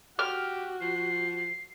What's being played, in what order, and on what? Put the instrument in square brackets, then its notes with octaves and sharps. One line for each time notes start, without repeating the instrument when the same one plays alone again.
[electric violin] F#4 [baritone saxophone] G4 [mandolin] F6
[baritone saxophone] F3 [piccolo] C7